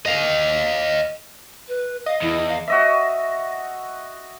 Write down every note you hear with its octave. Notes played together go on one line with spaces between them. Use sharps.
D#5 F5
B4
D#5 F5
E2 E4
F5
F#4 D#5 E5